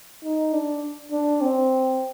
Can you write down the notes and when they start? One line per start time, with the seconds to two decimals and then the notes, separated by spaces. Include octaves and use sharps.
0.24 D#4
0.53 D4
1.12 D4
1.41 C4